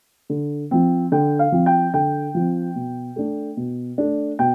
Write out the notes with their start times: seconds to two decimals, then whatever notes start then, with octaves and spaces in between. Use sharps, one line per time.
0.30 D3
0.71 F3 C4
1.12 D3 G5
1.39 F5
1.52 F3 C4
1.66 G5
1.93 D3 G5
2.35 F3 C4
2.75 B2
3.16 A3 D4
3.57 B2
3.98 A3 D4
4.39 B2 G5